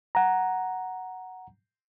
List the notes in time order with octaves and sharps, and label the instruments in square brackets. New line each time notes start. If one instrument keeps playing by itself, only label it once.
[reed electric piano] F#5 A#5